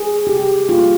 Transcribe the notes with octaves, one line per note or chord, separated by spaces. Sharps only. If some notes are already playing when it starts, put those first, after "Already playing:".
Already playing: G#4
C3 G4
G3 A#3 F4